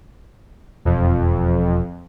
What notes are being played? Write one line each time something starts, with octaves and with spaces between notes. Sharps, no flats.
E1 F2